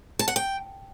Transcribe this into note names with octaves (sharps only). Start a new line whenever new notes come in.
A5
F#5
G5